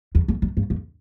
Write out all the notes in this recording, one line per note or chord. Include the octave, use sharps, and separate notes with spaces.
E2
F2
F#2
G2
F2